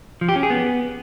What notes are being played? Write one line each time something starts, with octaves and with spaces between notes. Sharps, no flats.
F3
G4
C#4
G#4
B3